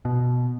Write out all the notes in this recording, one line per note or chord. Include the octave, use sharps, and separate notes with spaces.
B2